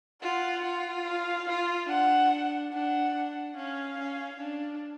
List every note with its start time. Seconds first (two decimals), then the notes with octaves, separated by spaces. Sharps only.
0.23 F4 F#5
0.64 F4
1.06 F5
1.48 F4
1.89 D4 F#5
2.72 D4 F#5
3.15 D4
3.56 C#4 F5
3.98 C#4
4.40 D4